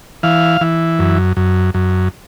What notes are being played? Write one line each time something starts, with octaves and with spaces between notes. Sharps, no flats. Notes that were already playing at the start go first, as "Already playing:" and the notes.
E3 F5
E3
F#2
F#2
F#2